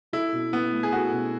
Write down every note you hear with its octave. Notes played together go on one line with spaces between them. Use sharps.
E4 A4
B2
B3 E4
A3
G#4
F#4 A4
B2